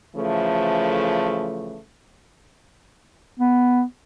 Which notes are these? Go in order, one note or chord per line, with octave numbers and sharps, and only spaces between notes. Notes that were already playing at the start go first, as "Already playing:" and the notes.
C#3 E3 F3 A3
B3